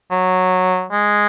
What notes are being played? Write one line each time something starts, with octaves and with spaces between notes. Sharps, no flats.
F#3
G#3